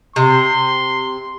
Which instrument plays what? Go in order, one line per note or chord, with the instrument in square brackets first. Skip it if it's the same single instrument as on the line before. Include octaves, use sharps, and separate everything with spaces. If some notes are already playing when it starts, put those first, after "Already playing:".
[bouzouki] C3 [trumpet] C6